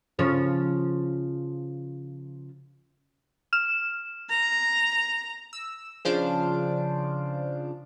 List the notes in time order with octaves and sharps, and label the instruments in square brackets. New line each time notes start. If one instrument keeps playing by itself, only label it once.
[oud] C#3 F3 C#5
[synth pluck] F6 E7
[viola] A#5
[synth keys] E6
C#3 F3 D4 C5 F5 D7